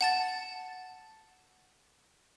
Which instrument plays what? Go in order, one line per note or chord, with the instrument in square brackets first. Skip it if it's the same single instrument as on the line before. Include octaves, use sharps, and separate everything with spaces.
[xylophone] F#5 A5 A6